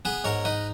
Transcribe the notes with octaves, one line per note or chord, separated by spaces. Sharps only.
B3 G#4 B4
G#2 A#4 C#5
D#4 B4 D#5